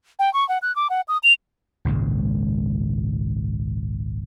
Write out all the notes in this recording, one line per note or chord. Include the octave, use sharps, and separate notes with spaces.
G5
C#6
F#5
F#6
D6
F#5
D#6
F7
G#1 C#2 A#2 G#3